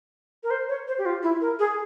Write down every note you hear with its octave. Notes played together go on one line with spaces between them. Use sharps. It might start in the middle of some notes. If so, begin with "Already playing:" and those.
A#4
C5
C#5
C5
G4
F4
E4
A#4
G#4